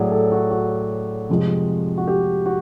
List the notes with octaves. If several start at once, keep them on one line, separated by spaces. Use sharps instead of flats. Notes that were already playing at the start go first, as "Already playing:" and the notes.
Already playing: A2 F#3 G#4 D5
A4
F#4
F#4
F2 C3 F3 G#3
F#4
G4
F#4